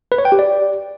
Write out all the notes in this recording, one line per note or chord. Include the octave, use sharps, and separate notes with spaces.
B4
C#5
G5
G4
D5